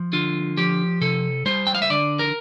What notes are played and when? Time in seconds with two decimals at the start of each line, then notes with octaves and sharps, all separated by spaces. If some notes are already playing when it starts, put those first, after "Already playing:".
Already playing: F3
0.13 D3 F4
0.57 F3 G4
1.01 C3 A4
1.46 G3 C5
1.67 G5
1.75 F5
1.82 E5
1.90 D3 D5
2.19 A#4